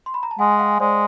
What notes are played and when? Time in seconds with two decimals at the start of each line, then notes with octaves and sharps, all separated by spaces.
0.06 C6
0.14 B5
0.23 A#5
0.31 A5
0.39 G#3 F#5 G#5
0.52 G#5
0.59 F5 G5
0.80 G#3 C5 D5